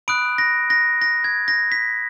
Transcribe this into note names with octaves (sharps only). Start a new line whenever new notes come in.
B5 D#6 F#6 D7
A#6
A#6
A#6
G#6
A#6
B6